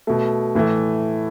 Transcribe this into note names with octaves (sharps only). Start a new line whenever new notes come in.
B2 A3
A2 E3 A3